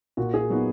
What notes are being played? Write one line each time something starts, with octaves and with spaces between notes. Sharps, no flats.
A#2 F#4
G#4
F#3 B3 D#4 F#4